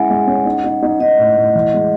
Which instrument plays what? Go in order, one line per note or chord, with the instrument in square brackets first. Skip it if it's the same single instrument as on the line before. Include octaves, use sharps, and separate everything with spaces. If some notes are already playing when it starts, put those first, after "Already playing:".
Already playing: [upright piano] G#3 C#4 E4 [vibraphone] F#5 G#5
[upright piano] G#3
C#4
D#4
D#4
D#4
[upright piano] D#4 [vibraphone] D#5
[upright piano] A2
A2
E3
G#3